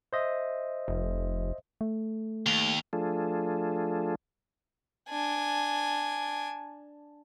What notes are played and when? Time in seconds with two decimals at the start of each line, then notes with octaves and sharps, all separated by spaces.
0.13 C5 D#5 E5
0.88 F1
1.81 A3
2.46 D#2 F7 G7
2.93 F3 A3 D4 F4 G#4 A4
5.10 D4 G#5